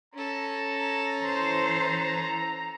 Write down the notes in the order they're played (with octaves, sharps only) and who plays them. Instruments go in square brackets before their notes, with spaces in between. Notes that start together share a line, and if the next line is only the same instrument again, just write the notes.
[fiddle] C#4 A4 [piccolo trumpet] A#5
[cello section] E3 C5